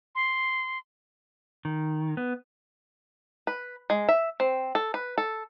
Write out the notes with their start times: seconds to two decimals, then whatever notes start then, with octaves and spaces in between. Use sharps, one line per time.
0.15 C6
1.65 D#3
2.17 B3
3.47 B4
3.90 G#3
4.09 E5
4.40 C4
4.75 A4
4.94 B4
5.18 A4